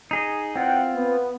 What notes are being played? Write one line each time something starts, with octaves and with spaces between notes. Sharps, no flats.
D#4 G#4 D#5
E2 C4 F4 F#5 G5
B3